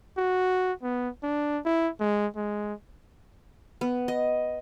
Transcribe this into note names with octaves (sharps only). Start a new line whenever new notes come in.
F#4
B3
D4
E4
G#3
G#3
B3
D#5